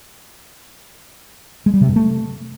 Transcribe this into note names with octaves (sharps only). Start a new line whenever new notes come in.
G#3
G3
C3
G2
A3